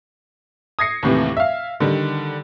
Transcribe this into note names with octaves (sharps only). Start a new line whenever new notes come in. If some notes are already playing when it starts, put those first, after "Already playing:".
D#6 G#6 A#6 C7 C#7
D#2 A2 C3 E3
E5 F5
D3 D#3 G3